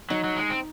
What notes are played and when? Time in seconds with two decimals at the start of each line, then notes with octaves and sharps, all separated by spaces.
0.10 F#3 D#4
0.24 F#3
0.37 G#3
0.50 C4